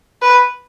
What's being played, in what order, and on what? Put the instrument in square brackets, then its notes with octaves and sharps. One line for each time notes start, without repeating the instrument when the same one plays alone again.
[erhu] B4